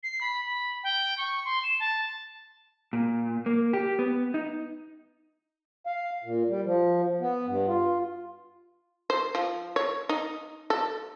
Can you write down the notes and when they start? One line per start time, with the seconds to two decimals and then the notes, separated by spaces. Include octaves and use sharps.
0.03 C7
0.21 B5
0.46 B5
0.84 G5
1.18 C#6
1.45 C6
1.63 E7
1.80 A5
2.93 A#2
3.46 A#3
3.73 G4
3.99 B3
4.34 D#4
5.87 F5
6.24 A#2
6.49 G3
6.65 F3
7.21 B3
7.47 G2
7.68 F4
9.10 C5
9.35 F3
9.76 C#5
10.09 D#4
10.70 A4